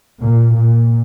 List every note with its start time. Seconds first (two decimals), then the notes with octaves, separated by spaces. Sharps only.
0.21 A#2
0.56 A#2